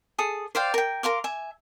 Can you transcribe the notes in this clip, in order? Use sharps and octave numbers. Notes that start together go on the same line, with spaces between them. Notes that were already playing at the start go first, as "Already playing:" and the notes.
G#4 A4 D#6
C5 D5 F5 G5
A#4 G5
A#4 F5 C6 D6
E5 G#5